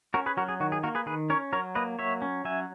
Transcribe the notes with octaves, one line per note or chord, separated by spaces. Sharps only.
C#4 F#4 A#4
G#4 B4
F#3 F#4 A#4
G#4
D#3 F#4
G#4
A#3 F#4 A#4
G#4 B4
D#3 G#4 B4
C#4 A#4 C#5
F#3 A#4 C#5
A#3 B4 D#5
F#3 C#5 E5
C#4
F#3 E5 G#5